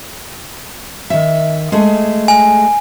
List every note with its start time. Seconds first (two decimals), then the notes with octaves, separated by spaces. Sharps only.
1.10 D#3 E5
1.72 G#3 A3 G#4
2.28 G#5